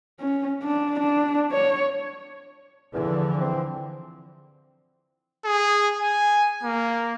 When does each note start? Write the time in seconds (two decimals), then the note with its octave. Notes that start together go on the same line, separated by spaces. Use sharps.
0.20 C#4
0.63 D4
1.00 D4
1.51 C#5
2.94 E2 D3 E3 F3
3.41 C4
5.45 G#4
5.99 G#5
6.63 A#3